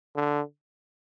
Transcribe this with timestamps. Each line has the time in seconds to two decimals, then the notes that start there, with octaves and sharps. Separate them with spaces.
0.16 D3